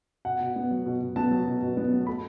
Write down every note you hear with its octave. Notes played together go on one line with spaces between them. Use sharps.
B2 F#5
B2
B3
F#3
B2
B2
B3 A5
F#3
B2
B2
B3
F#3
A3 B5